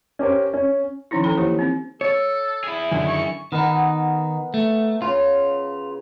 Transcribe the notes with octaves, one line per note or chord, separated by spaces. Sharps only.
C#4 G4 A#4 C5
C#4
D#3 F3 C#4 D#4 E4
E3 C#4 A4 G5 B5
A#3 E4 G4 C5 C#5
C4 D#4
A4 C#5
E4 G#4
F#2 D3 D#3 G#5
C#6
D#3 B3 D#4 A#4 F#5
A3
C#3 F4